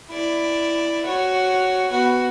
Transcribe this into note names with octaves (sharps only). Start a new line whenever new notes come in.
E4 D5
F#4 C#5
B3 F#4